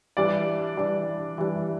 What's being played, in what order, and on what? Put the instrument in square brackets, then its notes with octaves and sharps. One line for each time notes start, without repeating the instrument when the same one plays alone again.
[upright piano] E3 G3 D4 D5
E3 G3 D4
E3 G3 D4